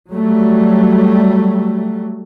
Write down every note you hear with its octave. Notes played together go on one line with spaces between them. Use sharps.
F#3 G3 A3